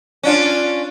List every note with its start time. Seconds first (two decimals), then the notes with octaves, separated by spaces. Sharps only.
0.23 C#4 D4 F4